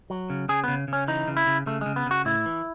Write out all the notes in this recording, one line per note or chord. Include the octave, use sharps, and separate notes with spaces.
F#3
C#3
C#3 G#4
C#3 B3
C#3 C#4
E3 D#4
C#3
E4
C#3
C#3 A3
C#3 G#3
B3
C#3 F#4
A2 E4
E3